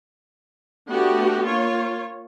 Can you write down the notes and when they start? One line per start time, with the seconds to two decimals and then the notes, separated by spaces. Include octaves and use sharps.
0.90 A3 B3 D4 F#4 G4
1.47 A#3 F4 C#5